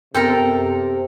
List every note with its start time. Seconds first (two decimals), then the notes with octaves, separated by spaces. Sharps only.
0.14 F#2 C3 B3 A4 A#4 G5 C6